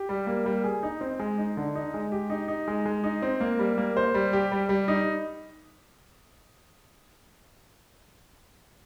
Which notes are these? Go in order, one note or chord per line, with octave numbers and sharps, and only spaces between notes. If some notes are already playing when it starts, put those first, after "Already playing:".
Already playing: G4
G3
A#3
G3
G#4
D#4
C4
G#3
D#4
D3
D#4
G#3
G4
D#4
D#4
G#3
G#3
D#4
C4
A#3
G3
A#3
C5
G3
G4
G3
G3
D#4